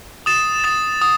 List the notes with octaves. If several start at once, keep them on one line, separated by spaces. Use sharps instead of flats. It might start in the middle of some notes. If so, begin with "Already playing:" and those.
D#6 A6 E7
D#6 A6 E7
D#6